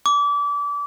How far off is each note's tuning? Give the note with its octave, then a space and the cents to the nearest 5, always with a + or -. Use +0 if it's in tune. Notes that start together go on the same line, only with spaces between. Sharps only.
D6 -30